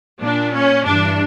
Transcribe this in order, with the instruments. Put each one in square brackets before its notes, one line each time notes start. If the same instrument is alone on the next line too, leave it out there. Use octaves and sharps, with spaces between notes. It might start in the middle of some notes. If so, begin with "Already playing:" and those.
[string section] A#2 D4
C#4
G2 E3 D4